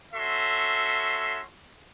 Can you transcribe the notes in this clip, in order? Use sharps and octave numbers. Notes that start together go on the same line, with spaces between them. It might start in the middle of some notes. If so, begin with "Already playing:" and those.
C#4 F#4 A4 E5 C6